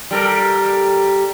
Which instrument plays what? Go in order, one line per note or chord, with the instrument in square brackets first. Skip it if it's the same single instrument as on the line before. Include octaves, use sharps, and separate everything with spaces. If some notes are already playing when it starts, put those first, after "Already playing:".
[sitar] G3 A4 A#4